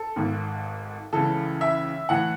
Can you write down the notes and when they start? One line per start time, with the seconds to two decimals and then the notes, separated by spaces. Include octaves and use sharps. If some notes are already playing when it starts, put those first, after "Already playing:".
Already playing: A4
0.16 G#1 G#2 D#3
1.13 C#2 C#3 E3 A4
1.61 E5
2.09 A2 E3 F#5